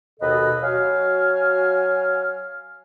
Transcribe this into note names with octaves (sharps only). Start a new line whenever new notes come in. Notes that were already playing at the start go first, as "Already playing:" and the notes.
D#2 B2 A4 B4 D#5
F#3 F#4 F5 G#5 F6